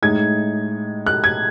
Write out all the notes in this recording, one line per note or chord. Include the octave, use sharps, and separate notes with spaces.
A2 G#3 D#4 G#6
F#6
G#6